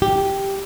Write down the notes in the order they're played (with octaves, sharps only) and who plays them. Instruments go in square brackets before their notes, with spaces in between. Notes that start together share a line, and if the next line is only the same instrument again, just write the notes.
[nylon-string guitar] G4